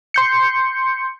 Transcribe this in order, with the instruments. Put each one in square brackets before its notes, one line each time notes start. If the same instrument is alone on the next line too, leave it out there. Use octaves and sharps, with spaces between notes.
[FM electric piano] C6 G6 C#7